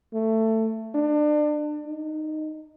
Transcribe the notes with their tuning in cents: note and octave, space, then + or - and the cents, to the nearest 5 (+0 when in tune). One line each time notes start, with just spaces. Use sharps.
A3 +15
D4 +30
D#4 -10